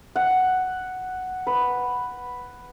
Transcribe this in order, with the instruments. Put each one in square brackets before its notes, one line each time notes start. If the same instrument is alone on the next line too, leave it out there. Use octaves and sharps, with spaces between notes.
[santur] F#5
B4